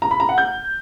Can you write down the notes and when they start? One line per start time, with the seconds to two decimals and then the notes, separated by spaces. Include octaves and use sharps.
0.02 A#5
0.11 B5
0.20 A#5
0.29 F#5
0.38 G6